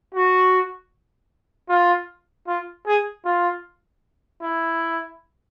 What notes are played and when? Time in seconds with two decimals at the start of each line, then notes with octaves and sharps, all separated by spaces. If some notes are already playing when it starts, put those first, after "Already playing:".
0.15 F#4
1.69 F4
2.47 F4
2.86 G#4
3.25 F4
4.42 E4